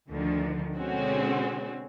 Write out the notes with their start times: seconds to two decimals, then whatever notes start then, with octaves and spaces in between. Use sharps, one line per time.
0.10 D2 D3 D#3 F3
0.73 B2 D3 G#3 C4 C#4 F#4